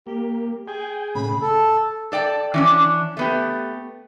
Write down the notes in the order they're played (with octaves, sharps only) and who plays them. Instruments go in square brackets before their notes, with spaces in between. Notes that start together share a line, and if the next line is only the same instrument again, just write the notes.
[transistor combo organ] A#3 [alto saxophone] G4
[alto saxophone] G#4 [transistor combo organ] G5 G#5
[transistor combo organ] A2 C#3 [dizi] B5
[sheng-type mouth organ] A4
[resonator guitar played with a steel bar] A4 D5 G5 A5
E3 C#4 D4
A3 B3 G4